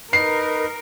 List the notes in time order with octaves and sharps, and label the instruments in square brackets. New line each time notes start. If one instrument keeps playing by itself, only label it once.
[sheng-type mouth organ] D#4 B4 [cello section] A#4 [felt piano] C7